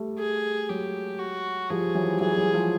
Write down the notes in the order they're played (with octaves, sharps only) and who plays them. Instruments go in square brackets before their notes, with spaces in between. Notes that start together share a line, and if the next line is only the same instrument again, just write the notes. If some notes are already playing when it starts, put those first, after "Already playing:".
Already playing: [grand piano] G3 A3
[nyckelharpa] G#4
[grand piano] F#3 G#3 [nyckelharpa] G4
[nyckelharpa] F#4
[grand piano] F3 G3 [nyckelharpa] G#4
[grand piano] E3 F#3
G3
[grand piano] E3 F#3 [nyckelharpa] G#4
[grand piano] G3
F#3 G#3
F3 G3